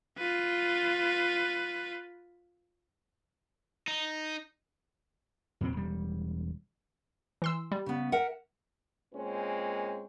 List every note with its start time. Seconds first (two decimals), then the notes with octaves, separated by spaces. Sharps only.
0.18 F4 B4
3.88 D#4
5.61 F2 A#2 C4
5.73 E1 G3
7.42 E3 C6 E6
7.72 G3
7.86 C#3 B3
8.12 A#4 E5 F#5
9.14 A#2 G#3 A#3 C4 C#4 B4